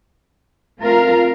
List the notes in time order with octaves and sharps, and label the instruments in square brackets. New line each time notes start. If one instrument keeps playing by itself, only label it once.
[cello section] A3 C4 F4 A#4 F5